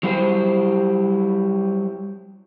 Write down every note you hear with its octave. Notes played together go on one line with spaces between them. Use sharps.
F#3 G3 E4 G4 B4 C5